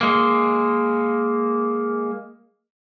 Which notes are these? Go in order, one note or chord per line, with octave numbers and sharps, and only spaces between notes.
G#3 A#3